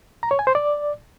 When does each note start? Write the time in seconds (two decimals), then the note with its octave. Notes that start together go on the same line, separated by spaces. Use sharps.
0.23 A#5
0.31 C#5
0.39 G#5
0.47 C5
0.55 D5